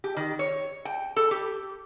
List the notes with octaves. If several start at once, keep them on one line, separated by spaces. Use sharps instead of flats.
G4
D#3
C#5
G5
A4
G4